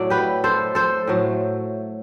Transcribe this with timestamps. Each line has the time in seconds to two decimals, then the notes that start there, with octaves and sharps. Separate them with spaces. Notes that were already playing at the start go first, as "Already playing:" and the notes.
Already playing: A2 F#3 A3 D5
0.10 G4 B4
0.44 A4 C5
0.75 A4 C5
1.07 A2 F#3 A3